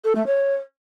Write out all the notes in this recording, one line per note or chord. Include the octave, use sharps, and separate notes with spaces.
A4
A3
C#5